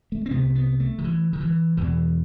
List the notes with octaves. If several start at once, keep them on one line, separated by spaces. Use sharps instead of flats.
A3
C4
C2 C3 B3
B3
A3
D#3
E3
D#3
E3
E2 B2 E3